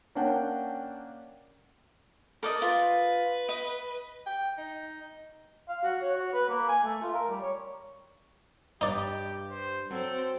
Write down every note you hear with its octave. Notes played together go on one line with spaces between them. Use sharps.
A#3 C#4 D4 F#5 G5 A5
A4 A#4 D5 D#5
F4 B4
D#5
G5
D#4
F5
F#4
C#5
F#4
B4
A#3
G#5
A3
F4
A#4
G3
C#5
G2 D#4 G4 D5
C5
F#3 C4 A4